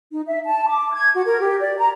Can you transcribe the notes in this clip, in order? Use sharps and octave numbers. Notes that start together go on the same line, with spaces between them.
D#4
E5
A5
D6
G#6
F#4
A#4
G4
D5
A#5